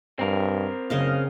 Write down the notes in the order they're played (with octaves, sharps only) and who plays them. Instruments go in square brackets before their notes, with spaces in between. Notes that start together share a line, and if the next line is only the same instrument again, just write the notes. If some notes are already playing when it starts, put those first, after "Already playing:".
[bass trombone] G2 [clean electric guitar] C4 A#4
[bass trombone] F#1 [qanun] C#3 D#5 F5